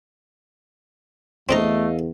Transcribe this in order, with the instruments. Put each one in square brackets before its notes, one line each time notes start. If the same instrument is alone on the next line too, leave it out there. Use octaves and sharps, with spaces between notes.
[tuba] E2 [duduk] A3 [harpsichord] C4 D4 A#5 [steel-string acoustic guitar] A4 D#5 F5